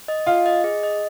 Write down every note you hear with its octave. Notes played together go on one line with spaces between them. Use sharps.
D#5
F4 D#5
D#5
G#4
D#5